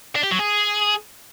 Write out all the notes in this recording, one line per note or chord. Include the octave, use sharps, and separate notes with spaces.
D4
G4
F#3
G#4